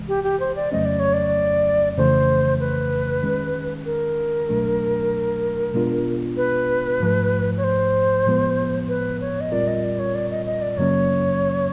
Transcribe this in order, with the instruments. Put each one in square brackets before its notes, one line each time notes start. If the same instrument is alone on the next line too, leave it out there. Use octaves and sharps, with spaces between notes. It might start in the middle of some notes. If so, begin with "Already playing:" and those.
Already playing: [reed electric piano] C2 C3 E3 G#3
[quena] G4
G4
C5
D5
[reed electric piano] F2 C#3 F#3 A3 C#4 [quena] D#5
[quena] D5
C#5
D5
[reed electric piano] F2 C#3 E3 A3 [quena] C5
[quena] B4
[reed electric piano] D#3 G#3 C#4
[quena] A#4
[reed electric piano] C2 B2 F#3 A3 D4
B2 G#3 B3 D4 F4
[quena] B4
[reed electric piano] G#2 F3 A3
[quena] C#5
C5
[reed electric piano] A2 F3 G#3 B3
[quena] B4
C#5
D#5
[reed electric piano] A#2 G3 C4 F4 A#4 [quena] D5
[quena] D#5
D5
C#5
D5
D#5
D#5
D5
[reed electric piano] F#2 C#3 F#3 A#3 C#4 [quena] C#5